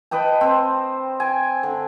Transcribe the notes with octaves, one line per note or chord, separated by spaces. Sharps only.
B4 D#5 G5 A5
C4 C5
G5 G#5
D3